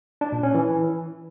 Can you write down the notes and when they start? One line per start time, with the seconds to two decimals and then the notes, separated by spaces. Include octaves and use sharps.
0.21 D4
0.32 A#2
0.43 C#4
0.54 E3